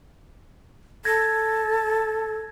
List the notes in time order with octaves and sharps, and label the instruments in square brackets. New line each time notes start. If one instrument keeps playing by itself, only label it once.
[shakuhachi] A4 [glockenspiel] G#6 A#6